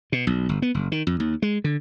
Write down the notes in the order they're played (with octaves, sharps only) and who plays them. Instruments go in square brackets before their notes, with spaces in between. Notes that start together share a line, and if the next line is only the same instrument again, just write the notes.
[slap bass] B2
B1
G1
B3
F#1
D#3
F2
D#2
G#3
D3